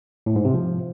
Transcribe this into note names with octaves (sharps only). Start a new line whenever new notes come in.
A2
G#2
C3
F3